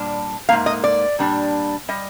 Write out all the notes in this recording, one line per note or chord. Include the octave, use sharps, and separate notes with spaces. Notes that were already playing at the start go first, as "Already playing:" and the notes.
Already playing: A#2 G3 D4
G#2 F3 A#3 F5
D#5
D5
A#2 G3 D4
G3 D#5